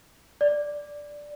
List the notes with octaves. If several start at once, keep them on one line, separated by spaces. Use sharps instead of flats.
D5